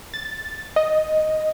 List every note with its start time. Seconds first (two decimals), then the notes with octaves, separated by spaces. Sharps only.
0.14 A6
0.76 D#5